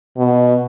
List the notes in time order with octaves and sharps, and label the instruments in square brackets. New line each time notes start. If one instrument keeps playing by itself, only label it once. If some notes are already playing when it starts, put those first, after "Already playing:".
[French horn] B2